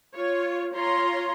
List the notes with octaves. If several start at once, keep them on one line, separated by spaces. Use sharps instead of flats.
F4 C#5
F4 C#5 A#5 C6